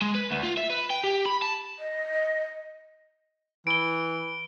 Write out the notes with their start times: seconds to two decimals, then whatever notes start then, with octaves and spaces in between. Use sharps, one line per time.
0.02 G#3
0.15 B4
0.31 D2
0.44 F4
0.57 E5
0.70 B4
0.90 G5
1.04 G4
1.26 B5
1.42 A5
1.79 D#5
3.67 E3 D7 G7